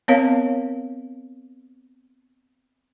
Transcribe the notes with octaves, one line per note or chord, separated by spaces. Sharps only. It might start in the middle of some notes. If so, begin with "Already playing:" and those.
B3 C4 A#4 C#5 D#5 F5